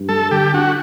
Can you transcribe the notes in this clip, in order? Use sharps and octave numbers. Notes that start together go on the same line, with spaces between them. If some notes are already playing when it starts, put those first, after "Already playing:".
Already playing: G2
G3 A4
D3 G4
D4 F#4